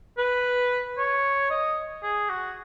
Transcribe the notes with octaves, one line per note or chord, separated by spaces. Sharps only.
B4
C#5
D#5
G#4
F#4